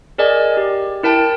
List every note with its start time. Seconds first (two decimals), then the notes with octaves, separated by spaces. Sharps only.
0.18 G#4 A#4 D5 D#5 G#5
0.57 G4
1.03 E4 A#4 G5 A5